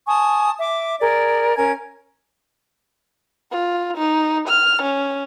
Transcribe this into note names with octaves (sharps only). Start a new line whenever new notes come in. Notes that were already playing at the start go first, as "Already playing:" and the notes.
G#5 A5 C#6 D#6
E5 D6
G#4 A#4 D5
C#4 A#4 G#5 G#6
F4
D#4
F6
C#4